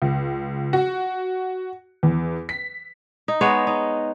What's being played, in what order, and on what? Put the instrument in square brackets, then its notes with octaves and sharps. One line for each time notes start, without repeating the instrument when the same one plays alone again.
[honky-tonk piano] C#2
F#4
E2
B6
[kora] D#4
G#3 B3 C#5
D#4